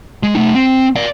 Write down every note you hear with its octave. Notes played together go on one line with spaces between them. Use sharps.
G#3
A3 D#4
C4
D5 F5